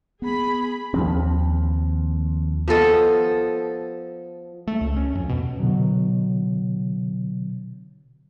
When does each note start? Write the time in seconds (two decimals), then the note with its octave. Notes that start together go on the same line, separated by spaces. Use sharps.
0.22 B3 G#4 B5
0.94 D#2 F3 C4
2.68 F3 B3 A4 D#5
4.67 A3
4.81 C#2
4.96 C#4
5.15 F2
5.29 B2
5.59 B2 D3 F#3